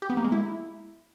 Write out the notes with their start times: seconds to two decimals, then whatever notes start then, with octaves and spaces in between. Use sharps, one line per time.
0.02 G4
0.10 B3
0.17 A#3
0.24 G#3
0.32 E4